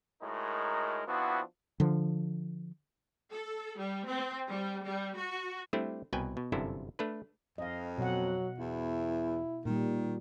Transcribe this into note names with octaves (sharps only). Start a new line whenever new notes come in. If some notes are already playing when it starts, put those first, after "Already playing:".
A2 G#3 D#4 F#4 A#4
F3 B3 C4 D4 E4 F#4
D3 F3
A4
G3
C4
G3
G3
F#4
G3 A3 C4 D4 E4
C2 B2 B4 G5 G#5
B2
G1 F#2 C3 D4 E4 A4
A3 D4 B4
F2 D#5 F5
B2 F#3 F#5
E2 E4
A#2 D#3 G3